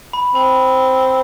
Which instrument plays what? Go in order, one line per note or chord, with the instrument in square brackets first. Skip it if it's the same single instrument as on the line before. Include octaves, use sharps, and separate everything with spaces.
[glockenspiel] B5
[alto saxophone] C4 [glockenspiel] B5